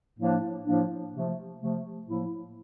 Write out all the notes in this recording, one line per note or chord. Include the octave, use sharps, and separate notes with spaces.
A2 F3 A#3 D4
A2 F3 A#3 D4
C3 F3 A3
C3 F3 A3
A2 F3 A#3 E4